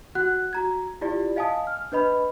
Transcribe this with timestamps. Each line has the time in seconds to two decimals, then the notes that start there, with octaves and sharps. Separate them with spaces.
0.15 F#4 F#5 F#6
0.53 F#4 A#5 G#6
1.01 E4 F4 G4 D5
1.36 D#5 F5 G#5 A5 D#6
1.67 F6
1.92 D4 B4 D#5 B5